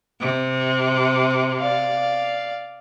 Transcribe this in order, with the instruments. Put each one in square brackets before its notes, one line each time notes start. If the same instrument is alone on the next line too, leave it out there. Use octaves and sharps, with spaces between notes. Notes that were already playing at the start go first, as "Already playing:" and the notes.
[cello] C3
[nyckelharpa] D5 F5